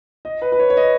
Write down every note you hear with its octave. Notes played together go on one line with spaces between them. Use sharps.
D#5
B4
B4
C#5
C#5
D#5